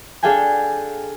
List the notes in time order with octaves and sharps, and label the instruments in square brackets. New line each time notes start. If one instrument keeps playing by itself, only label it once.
[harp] D4 G#4 A4 F5 G5 G#5